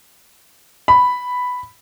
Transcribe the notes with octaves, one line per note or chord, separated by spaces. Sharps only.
B5